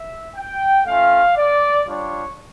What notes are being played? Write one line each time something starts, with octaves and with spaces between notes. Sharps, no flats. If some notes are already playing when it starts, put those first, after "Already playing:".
Already playing: E5
G5
A3 C#4 F4 F5
D5
G3 D4 F4 C#5